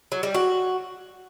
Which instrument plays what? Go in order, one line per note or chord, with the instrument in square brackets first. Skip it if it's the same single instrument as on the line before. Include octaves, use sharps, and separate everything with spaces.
[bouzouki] F#3
G3
F#4